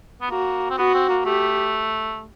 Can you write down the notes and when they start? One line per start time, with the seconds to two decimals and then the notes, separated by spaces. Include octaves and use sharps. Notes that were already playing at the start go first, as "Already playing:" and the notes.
0.21 B3
0.30 A#3 F#4
0.70 C4
0.78 B3 F#4
0.94 C4
1.09 A#3
1.25 A3 G4